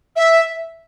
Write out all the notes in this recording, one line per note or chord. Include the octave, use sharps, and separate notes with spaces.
E5